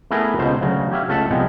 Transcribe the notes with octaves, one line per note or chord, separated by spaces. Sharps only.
A3 B3 E4 G#4 A#4 B4
C#2 B2 C5
D2 C#3 F#3
G4 C#5 E5 F5
C#2 A3 A4 E5 F#5
C2 F3 G#3 B3 C4